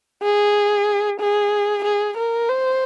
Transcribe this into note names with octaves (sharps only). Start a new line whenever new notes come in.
G#4
G#4
G#4
A#4
C5